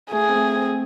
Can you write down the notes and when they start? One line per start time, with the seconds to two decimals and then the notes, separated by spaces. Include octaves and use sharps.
0.11 A3 G#4
0.28 C4
0.34 A3
0.56 C4